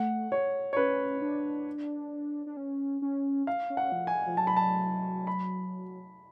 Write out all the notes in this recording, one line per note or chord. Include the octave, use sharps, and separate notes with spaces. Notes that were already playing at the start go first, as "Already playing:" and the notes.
Already playing: A3 F#5
C#5
C#5
C#4 B4
D4
D4
C#4
C#4
F5
C#4
F#5
F3
G#5
F3
F#3 A5
B5
A5
B5